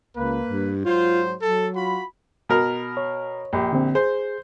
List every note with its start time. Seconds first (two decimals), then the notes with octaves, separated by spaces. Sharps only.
0.16 C#2 A#3 B4
0.48 G2
0.85 G#2 F#3 F4 C5
1.41 F#3 A4
1.74 F4 F#4 B5
2.49 B2 A#4
2.97 C#5
3.53 A#1 G4
3.73 D3 C4
3.95 G#4 C5